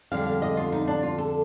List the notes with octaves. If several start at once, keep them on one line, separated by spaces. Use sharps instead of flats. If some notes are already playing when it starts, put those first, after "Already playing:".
F2 D3 G3 F5
F5
D#5
F4
D#4
D4
F4
A4